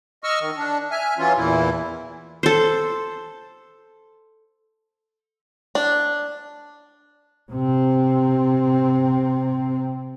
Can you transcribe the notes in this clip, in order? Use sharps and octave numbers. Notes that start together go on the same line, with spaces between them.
D#5 C#6 E6 F6
D#3
D4
E5 G#5 F6
E3 F#3 C#4 F4
E2 A#2 E3 E4
A4 C5
D4
C3 C4